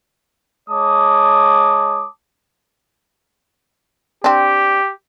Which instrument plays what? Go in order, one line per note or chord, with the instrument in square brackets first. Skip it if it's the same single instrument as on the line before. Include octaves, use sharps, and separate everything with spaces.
[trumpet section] G#3 C#5 A5 D6 D#6
[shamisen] C4 D4 [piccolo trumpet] G4